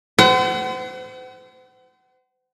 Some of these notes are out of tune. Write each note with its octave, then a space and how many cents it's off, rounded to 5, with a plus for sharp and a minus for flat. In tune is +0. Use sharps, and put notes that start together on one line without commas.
C5 -35 F#5 +35